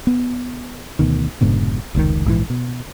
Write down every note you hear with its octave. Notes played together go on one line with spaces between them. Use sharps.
B3
D2 B2 D#3
F1 G#2 B2 D3
F1 C#2 A#2 D#3
A#1 G#2 C3 E3
B2